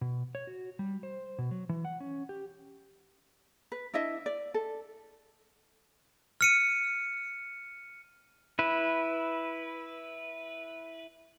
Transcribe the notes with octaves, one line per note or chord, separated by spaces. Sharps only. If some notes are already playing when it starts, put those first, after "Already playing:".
B2
C#5
F#4
G3
C5
B2
F#3
E3
F#5
C#4
G4
B4
D4 E4 D#5 E5
D5
A4
F6 C#7 D#7
E4 B4